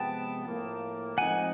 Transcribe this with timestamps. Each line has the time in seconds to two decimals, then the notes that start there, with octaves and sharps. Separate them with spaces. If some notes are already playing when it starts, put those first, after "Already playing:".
Already playing: C3 F3 G#3 B3 G5 A5
0.45 A2 F3 A#3
1.18 F3 G#3 C4 D#4 F#5 G#5